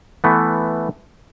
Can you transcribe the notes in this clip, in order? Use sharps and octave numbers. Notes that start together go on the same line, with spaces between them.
E3 A3 B3